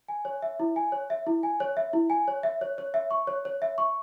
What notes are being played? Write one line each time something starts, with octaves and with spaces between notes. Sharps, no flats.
G#5
C#5
E5
E4
G#5
C#5
E5
E4
G#5
C#5
E5
E4
G#5
C#5
E5
C#5
C#5
E5
C#6
C#5
C#5
E5
C#6